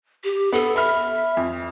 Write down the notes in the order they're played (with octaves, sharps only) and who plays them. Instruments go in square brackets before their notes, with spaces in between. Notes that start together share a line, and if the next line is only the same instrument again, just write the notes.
[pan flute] G4
[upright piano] B3 [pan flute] A4
[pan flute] E5 [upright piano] B5 F6
[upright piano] F2